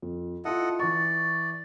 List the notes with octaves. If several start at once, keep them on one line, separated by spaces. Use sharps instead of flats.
F2
E4 F4 A4 D#5 F#5
E3 D5 C#6